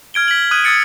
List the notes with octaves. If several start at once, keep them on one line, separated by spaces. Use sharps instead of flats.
F6 G#6 D7 G7
B6 F#7
D#6 F#6 G#6 D#7 F#7
D#6 E6 G#6 A6 C#7 D7